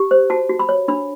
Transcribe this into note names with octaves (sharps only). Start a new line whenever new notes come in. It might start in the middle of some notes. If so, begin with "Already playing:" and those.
Already playing: G4
C5
F#4 A5
F#4
B5
C#5
D4 B5